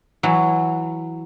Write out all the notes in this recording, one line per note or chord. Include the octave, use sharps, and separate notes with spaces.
E3 F#3